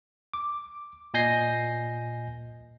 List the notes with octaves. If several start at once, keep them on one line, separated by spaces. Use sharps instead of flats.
D6
A#2 D#5 G#5 G6 A#6 C7